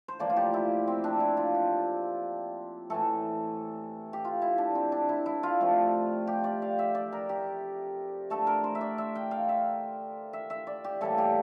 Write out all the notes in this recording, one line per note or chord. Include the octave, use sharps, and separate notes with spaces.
C5
A2 F3 A#3 D5
F4
G4
E4
C4
D4
E4
F4
G4
A2 E3 A3 A4
G4
F4
E4
D4
C4
D4
E4
E4
F4
C3 F3 A3
G4
D5
F5
E5
D5
A#4
G4
D3 A3 A4
A#4
C5
E5
D5
E5
G5
F5
E5
E5
E5
D5
G4
A2 E3 G3 A#3 A4
G4